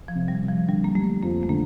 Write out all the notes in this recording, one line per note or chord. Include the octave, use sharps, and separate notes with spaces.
F3
C3
G3
C3
F3
D3 G3
A#3
G3 A3
F2 A#3
A3
D3 A#3